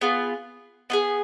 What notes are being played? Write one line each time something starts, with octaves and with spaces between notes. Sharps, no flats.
B3 F4 G#4
B3 F4 G#4